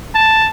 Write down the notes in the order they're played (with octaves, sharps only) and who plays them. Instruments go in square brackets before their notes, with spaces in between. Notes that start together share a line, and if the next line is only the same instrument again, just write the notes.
[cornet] A5